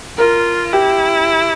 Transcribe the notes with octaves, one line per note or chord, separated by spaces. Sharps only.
F4 A#4
E4 G4